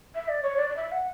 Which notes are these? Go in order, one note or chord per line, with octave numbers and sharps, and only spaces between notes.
E5
D5
C#5
D5
D5
E5
F#5